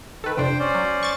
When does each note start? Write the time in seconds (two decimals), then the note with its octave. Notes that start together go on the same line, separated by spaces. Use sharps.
0.24 D#3 A4 B4
0.37 F2 C3 D4 C5 G5
0.59 C#4 C5 D5
0.75 F#3
1.03 C#6 A6